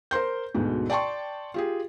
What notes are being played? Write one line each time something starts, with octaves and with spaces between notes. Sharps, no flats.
A#4 C5 C6 G6
D2 G#2 B2
D5 G5 A5 C6 C#6
F4 G4 G#4